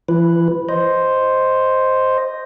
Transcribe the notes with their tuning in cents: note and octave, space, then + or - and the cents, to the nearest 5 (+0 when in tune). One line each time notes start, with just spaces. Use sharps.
E3 +40 B4 +0
C5 +0 D#5 +0